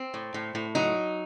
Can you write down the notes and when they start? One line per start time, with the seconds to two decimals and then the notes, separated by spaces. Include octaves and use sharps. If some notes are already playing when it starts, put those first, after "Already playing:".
Already playing: C4
0.14 A2
0.34 A2
0.55 A2
0.75 F#3 D#4